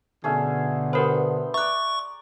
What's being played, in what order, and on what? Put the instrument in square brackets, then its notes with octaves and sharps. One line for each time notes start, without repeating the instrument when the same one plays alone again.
[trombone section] B2 D3 [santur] A3 C#4 G#4
[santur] B3 G5 C6 [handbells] G4 A#4 C5
[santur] D5 A#5 [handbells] E5 F#6 [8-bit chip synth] C#6